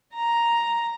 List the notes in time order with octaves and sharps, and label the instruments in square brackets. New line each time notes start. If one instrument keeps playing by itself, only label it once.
[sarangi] A#5